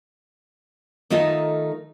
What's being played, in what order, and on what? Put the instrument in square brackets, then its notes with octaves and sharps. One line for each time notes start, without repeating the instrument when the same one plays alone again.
[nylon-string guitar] D#3 A3 D#4 F4 A4 D#5